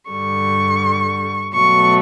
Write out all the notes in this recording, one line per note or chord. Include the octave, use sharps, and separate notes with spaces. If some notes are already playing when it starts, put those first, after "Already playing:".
G2 D3 G3 C#6
B2 F#3 A3 C#6